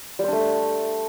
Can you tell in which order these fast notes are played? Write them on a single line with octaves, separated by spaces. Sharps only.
G3 C5 D4 A3